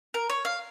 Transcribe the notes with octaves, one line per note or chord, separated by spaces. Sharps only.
A#4
C#5
F5